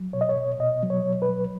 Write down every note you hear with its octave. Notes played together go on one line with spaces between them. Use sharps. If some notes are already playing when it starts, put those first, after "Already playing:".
Already playing: F#3
B2 C#5
D#5
C#5
B2
B2 D#5
F#3
C#5
B2
B4
F#3